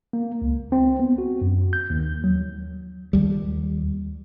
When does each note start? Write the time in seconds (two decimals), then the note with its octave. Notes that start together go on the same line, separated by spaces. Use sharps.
0.13 A#3
0.42 C#2
0.72 C4
1.00 B3
1.18 F#4
1.41 F#2
1.73 G6
1.90 D#2
2.24 F#3
3.13 D#2 G3